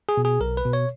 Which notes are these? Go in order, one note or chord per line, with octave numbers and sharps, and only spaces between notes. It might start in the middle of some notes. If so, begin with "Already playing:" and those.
G#4
B2
G#4
B1 A#4
B4
B2
C#5